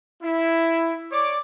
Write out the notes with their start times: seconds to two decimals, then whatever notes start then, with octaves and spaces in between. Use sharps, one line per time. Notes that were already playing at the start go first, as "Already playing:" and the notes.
0.22 E4
1.12 C#5 D5 D6